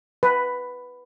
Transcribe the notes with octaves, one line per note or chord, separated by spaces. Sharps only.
B4